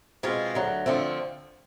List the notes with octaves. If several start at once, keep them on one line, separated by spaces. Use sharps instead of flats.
B2 G#3 C4 F4
D2 D3 F#3
D3 F3 A3 C4